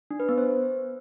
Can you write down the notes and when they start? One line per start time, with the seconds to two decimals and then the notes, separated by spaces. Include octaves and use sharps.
0.11 D4
0.20 B4
0.29 B3
0.38 C5